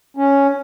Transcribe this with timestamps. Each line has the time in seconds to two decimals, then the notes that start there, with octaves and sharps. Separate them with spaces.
0.17 C#4